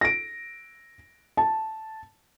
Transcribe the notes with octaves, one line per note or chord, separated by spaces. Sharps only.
A#6 D7
A5